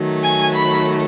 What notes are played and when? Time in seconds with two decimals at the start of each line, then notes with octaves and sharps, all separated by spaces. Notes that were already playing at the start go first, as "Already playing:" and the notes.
Already playing: D#3 F#3 A3
0.22 G#5
0.54 B5